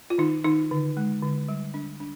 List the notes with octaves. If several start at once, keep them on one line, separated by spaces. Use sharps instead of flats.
F4
D#3 D#4
D#3 D#4
D3
G#3
D3
G3
D4
D4